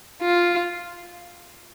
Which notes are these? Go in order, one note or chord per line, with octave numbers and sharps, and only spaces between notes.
F4